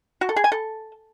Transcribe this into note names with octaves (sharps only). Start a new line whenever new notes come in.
F#4
A4
G#4
G#5
A4